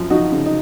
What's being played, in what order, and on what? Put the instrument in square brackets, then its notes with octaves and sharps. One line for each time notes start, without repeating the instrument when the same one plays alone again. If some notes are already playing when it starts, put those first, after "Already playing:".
Already playing: [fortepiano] F#2 F3 F4
F3 D#4 F#4
C#3
D#4